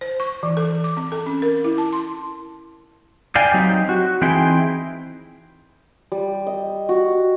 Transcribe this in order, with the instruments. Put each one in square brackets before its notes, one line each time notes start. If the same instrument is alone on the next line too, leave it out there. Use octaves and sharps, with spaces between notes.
[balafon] C5
C#6
E3
A4
D6
C4
A4
C#4
A#4
E4
A5
C6
[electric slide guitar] D5 F5 G5 G#5
F#3 C4 D#4 G4
F#4
E3 C4 D#4 E4 G#4 G5
[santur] G3
D#5
F#4